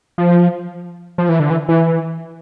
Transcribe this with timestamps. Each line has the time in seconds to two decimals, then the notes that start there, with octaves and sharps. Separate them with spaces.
0.18 F3
1.18 F3
1.29 E3
1.40 D3
1.50 E3
1.69 E3